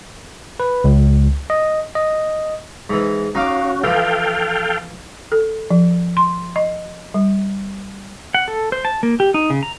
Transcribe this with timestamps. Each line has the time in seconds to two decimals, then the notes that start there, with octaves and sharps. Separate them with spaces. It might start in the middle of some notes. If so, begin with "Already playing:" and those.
0.60 B4
0.84 C#2
1.50 D#5
1.95 D#5
2.90 G#2 E3
3.35 C#4 D#4 F#4 F5 D6
3.84 E3 F3 A4 F5 G5
5.32 A4
5.70 F3
6.17 C6
6.56 D#5
7.14 G3
8.34 F#5
8.48 A4
8.72 C5
8.85 A5
9.03 A#3
9.20 G4
9.34 D#4
9.50 C#3
9.63 A#5